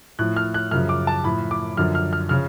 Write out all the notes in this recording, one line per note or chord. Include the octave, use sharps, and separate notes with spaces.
A2 F3 F#6
F6
F#6
F#2 C#3 F3 F6
D6
A5
A2 F3 B5
D6
F#2 D3 F3 F6
F6
F6
C#3 F3 F6